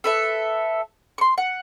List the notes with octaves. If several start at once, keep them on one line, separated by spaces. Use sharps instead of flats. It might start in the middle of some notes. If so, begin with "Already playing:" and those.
A4 B4 E5
C6 C#6
F#5